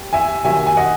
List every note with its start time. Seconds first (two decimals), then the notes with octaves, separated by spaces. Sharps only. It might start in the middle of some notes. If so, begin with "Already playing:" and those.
Already playing: D#2
0.13 E5 G#5
0.45 D#2 D#3 F#3 E5 G#5
0.66 G#5
0.77 D#5 F#5